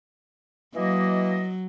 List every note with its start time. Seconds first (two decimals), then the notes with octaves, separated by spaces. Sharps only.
0.75 E3 F#3 A#3 D#5